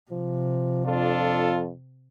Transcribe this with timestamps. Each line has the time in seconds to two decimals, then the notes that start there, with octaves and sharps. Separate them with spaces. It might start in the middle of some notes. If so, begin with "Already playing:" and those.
0.11 C3 F3
0.85 F2 D4 F4 A4